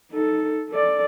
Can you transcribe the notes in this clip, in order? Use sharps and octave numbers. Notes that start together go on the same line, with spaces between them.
D#4 A4
A4 D5